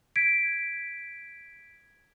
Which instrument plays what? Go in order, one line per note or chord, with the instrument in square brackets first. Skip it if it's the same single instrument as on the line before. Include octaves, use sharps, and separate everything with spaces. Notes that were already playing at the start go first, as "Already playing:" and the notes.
[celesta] G#6 B6 D7